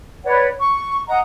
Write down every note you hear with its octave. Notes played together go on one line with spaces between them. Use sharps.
B4 C#5 D5 F#5
C#6
D#5 F#5 A#5